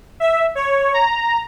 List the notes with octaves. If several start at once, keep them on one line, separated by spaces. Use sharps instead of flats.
E5
C#5
A#5